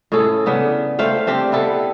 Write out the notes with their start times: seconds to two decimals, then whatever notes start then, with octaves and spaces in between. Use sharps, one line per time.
0.12 A2 C#4 G#4 A4
0.46 C#3 B3 D4
0.99 A3 C5 F5 G5
1.27 C4 D4 G4
1.52 B3 E4 A4